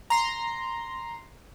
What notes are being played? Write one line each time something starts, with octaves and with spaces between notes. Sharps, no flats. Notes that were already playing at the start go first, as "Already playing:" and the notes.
A#5 C6